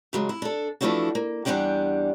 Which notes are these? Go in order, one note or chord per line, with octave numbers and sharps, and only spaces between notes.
C#3 F#3 G#3
E4
D4 A4
E3 F3 A3 D4 E4 F#4
A#3
E2 E3 G3 D4 F#5 G5